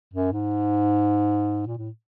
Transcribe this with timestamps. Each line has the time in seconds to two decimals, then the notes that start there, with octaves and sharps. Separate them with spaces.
0.13 F#2
0.32 G#2
1.67 A#2
1.78 A2